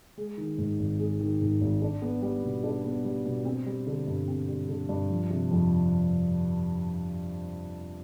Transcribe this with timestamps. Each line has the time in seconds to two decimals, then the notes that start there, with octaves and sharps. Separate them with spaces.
0.17 G#3
0.38 D#3
0.58 G#2
0.79 G#1
0.99 G#3
1.20 D#3
1.41 G#2
1.61 G#1
1.82 D4
2.02 B3
2.22 G3
2.43 B2
2.64 D4
2.84 B3
3.04 G3
3.25 B2
3.45 C4
3.66 G3
3.86 D3
4.07 G2
4.28 C4
4.49 G3
4.69 D3
4.89 G2
5.10 F3
5.30 C3
5.51 F2